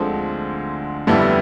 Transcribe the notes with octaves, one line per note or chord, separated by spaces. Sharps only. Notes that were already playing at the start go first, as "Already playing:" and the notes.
Already playing: D2 D3 F3 G#3 C4
F2 D3 G3 B3 E4